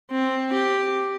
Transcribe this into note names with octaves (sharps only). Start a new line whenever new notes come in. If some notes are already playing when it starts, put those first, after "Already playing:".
C4
G4